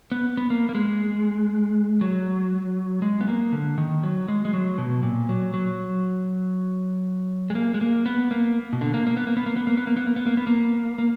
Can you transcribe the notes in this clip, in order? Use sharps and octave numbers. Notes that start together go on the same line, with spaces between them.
B3
B3
A#3
A#3
G#3
F#3
G#3
B3
A#3
D3
D#3
F#3
G#3
G#3
F#3
B2
A#2
F#3
F#3
G#3
A#3
G#3
A#3
B3
A#3
B2
D3
A#3
A#3
B3
A#3
B3
A#3
B3
A#3
B3
A#3
B3
A#3
B3
A#3
B3
A#3
A#3